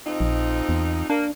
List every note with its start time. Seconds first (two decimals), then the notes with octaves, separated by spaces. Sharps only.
0.06 F2 C4 D#4
0.20 A#1
0.69 E2
1.10 A#3 D4